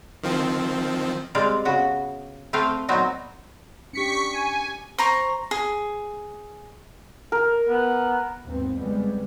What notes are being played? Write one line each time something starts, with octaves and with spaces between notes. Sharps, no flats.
D#3 F3 C4
G3 G#3 C4 D5 F5
C#3 B3 F#4
A3 C4 B4 F5 G5
A#2 F#3 B3 C4 D#4 F#4
C#4 D4 G4 C#6 B6 C#7
G#5
C5 A#5 C#6
G#4
A#4
B3
D#2 G#2 B3 C4
F2 C#3 G3 G#3 B3